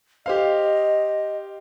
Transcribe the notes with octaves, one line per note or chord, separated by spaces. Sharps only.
G4 C5 D#5 F5